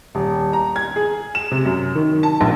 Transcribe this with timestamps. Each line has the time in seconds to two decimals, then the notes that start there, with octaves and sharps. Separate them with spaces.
0.15 D#1
0.53 A#5
0.76 G#6
0.96 G#4
1.35 E7
1.51 C3
1.65 F#2
1.95 D#3
2.23 A5
2.41 A#1